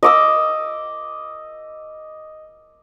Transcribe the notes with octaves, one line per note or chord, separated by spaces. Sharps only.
D#5 D6 E6